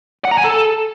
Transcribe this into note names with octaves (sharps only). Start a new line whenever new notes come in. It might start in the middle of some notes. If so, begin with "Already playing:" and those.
F#5
A#5
G#5
A4